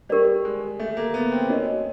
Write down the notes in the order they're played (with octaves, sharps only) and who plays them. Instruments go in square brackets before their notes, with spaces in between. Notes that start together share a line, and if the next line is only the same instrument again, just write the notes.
[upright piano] G3 [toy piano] G4 A#4 D5
[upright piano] G#3
A3
A#3
B3
C4
[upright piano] C#4 [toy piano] D#4 F#4 A#4 D#5